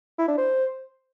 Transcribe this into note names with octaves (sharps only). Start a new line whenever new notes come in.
E4
D4
C5